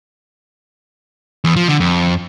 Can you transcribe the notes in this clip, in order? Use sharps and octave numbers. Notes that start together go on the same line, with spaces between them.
E2
F3
D3
F2